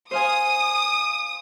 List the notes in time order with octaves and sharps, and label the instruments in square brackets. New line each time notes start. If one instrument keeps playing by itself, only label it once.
[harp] C5 F5 G#5 [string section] D#6